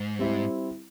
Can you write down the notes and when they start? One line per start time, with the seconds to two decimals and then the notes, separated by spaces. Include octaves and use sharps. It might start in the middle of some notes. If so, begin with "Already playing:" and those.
Already playing: G#2
0.19 G3 C4 E4